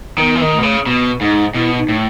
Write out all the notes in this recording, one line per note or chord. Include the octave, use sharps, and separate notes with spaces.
D#3 B3
E3
D#3
A3
B2
C#3
B2 B3
G#2 D#4
B2 E4
D#4
A2